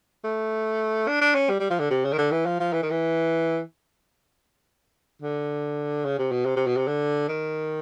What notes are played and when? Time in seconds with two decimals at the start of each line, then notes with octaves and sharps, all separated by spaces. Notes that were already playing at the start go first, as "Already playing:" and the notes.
0.24 A3
1.08 D4
1.21 D4
1.35 C#4
1.49 G3
1.60 G3
1.70 F3
1.80 D3
1.90 C3
2.04 C#3
2.13 D#3
2.18 D3
2.32 E3
2.46 F3
2.60 F3
2.73 E3
2.82 D#3
2.91 E3
5.22 D3
6.04 C#3
6.18 C3
6.31 B2
6.45 C3
6.56 C3
6.67 B2
6.77 C3
6.87 D3
7.28 D#3